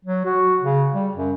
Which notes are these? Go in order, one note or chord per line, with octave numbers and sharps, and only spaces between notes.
F#3
F#4
C#3
G3
F#2